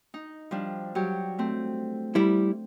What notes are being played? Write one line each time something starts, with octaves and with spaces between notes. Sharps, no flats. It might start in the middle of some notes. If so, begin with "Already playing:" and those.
D#4
F3 G3 D4
F#3 G3 G4
A3 C4
G3 E4